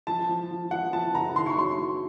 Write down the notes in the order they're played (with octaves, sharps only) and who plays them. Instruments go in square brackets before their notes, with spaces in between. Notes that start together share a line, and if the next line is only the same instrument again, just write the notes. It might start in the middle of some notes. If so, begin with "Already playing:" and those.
[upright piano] F3 A5
F3
F3
F3 F#5
F3 A5
F#1 A#5
D#3 C6
C#6
F#3 C6
F#3